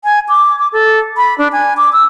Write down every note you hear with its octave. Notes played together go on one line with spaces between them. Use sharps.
G#5
D6
D6
A4
B5
D4
G#5
D6
E6